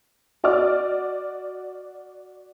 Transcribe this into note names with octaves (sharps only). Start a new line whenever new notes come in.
F#4 D5 D#5 D6 F6